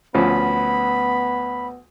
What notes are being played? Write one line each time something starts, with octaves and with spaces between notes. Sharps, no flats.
D2 F3 B3 C#4 B5